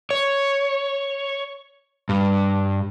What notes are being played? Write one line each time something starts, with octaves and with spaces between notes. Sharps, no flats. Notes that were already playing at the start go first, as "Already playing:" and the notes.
C#5
G2